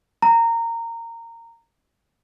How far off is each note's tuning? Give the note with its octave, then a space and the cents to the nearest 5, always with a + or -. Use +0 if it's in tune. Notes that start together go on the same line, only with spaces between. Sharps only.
A#5 -15